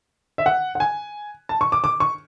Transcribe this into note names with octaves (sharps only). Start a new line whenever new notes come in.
E5
F#5
F#5
G#5
A5
C#6
D6
D6
C#6